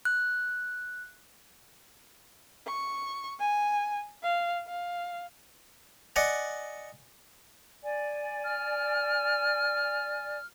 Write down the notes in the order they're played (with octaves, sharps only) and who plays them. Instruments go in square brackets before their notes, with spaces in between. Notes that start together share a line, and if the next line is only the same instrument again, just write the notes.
[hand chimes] F#6
[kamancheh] C#6
G#5
F5
F5
[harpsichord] D5 D#5 F#5 G#5
[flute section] D5 G#5
[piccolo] F6